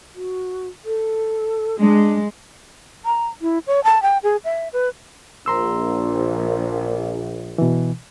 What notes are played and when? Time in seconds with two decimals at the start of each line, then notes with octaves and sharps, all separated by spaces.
0.15 F#4
0.84 A4
1.80 G#3 D4
3.05 A#5
3.42 E4
3.67 C#5
3.84 A5
4.02 G5
4.23 G#4
4.44 E5
4.73 B4
5.46 A#1 A#5 C6 E6
7.58 B2 E3